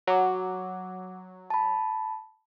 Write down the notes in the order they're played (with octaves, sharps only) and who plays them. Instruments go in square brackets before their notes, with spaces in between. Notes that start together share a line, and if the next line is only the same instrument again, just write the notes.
[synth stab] F#3 [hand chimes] F#5 D6
[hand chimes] A5 B5